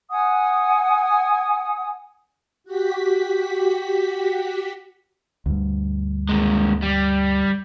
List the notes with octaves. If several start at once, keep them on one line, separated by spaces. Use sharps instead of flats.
F#5 G#5 D#6
F#4 G4 B6
D2 G2
D#2 G#3
G3